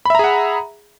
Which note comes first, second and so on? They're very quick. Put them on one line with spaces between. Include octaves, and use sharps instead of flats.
B5 E5 A#5 G#4 F#5